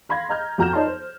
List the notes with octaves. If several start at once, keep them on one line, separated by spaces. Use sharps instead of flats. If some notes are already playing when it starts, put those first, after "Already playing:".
F5 B5 C6 G#6 A#6
D#5 A#5 F6 G6
F2 F#4 A#5 F6 G6 E7
D#4 C#5 D5 A5 C6
C5